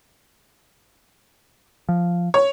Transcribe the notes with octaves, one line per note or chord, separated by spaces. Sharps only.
F3
C#5